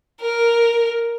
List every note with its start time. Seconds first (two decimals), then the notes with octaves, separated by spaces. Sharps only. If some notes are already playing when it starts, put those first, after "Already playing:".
0.21 A#4